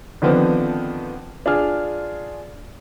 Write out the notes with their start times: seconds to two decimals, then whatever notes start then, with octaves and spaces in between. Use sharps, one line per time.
0.22 D3 D#3 F3 B3 C4
1.46 D4 F4 G#4 F6